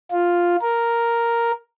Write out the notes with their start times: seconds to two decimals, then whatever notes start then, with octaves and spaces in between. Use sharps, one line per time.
0.11 F4
0.61 A#4